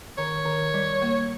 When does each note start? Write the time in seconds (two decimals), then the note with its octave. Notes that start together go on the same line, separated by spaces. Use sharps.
0.18 D#3 C#5
0.46 D#3
0.74 G3
1.02 A#3